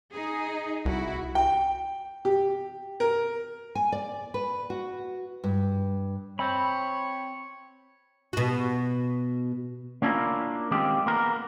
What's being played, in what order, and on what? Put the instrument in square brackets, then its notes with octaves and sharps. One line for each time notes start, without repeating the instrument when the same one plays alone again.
[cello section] D#4 G#4
[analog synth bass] C2 [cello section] E4 F#4
[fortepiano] G5
G4
A#4
[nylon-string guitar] G#5
D5
B4
F#4
G2
[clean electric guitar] C4 [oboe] C#5 [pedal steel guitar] B5
[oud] B2 F#4
[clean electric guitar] A#3 C#4 D4 E4 F4 A#4
D#3 G#3 C4 F4 G4
A#3 B3 A#4